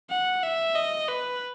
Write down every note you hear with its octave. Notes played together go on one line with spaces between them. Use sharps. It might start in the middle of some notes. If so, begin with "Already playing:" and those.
F#5
E5
D#5
B4